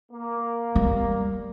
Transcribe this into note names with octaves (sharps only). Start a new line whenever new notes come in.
A#3
G3